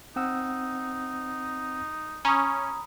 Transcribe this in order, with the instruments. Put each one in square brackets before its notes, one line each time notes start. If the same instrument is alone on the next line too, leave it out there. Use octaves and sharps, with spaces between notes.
[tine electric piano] C4 F#5 E6 [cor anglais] D#4
[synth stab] C#4 [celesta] A#5 D#6 [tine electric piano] B5